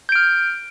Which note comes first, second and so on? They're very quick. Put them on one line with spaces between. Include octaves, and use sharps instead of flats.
G6 D7 F6